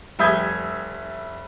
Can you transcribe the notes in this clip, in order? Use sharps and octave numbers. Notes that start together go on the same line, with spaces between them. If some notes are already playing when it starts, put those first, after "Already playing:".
F1 G3 E5 D#6 G6 G#6